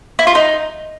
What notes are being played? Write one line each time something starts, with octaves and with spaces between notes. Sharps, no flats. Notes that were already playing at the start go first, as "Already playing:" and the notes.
E4
F4
D#4